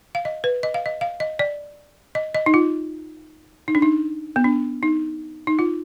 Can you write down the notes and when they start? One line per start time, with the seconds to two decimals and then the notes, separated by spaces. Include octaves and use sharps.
0.15 F5
0.25 D#5
0.44 B4
0.63 D#5
0.74 F5
0.86 D#5
1.01 F5
1.20 D#5
1.39 D5
2.15 D#5
2.35 D#5
2.46 D#4
2.54 F4
3.68 D#4
3.75 D4
3.82 D#4
4.36 B3
4.44 D4
4.83 D#4
5.47 D#4
5.59 F4